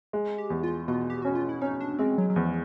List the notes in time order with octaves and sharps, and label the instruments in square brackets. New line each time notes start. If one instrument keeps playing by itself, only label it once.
[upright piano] G#3
[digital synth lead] G4
[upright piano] E2
[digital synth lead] F4
[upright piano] B2 [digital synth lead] F4
[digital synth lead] G4
[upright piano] C#4 [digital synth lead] F#4
[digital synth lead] F4
E4
[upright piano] C#4 [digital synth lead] D#4
[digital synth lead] D4
[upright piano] G#3 [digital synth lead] C4
[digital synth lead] F#3
F#3
[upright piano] E2 [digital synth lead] F3